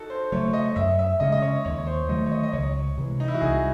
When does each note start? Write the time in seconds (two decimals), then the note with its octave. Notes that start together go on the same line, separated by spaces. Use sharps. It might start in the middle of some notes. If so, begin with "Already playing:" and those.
Already playing: D#4 F#4 A4
0.10 C5
0.32 C#3 F#3 A3 C#5
0.53 D#5
0.76 F#2 E5
0.99 E5
1.20 C#3 G#3 C#4 D#5
1.32 D#5
1.42 C#5
1.65 D#2 C#5
1.78 C#5
1.87 C5
2.09 D#3 F#3 A3 D#5
2.26 C#5
2.31 D#5
2.43 D#5
2.53 C#2 C#5
2.97 C3 E3 G#3
3.20 D#4
3.28 E4
3.34 F#4
3.41 C2 G#4